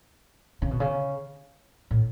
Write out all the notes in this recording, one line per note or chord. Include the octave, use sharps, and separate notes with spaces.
C#3
B2
C#3
A2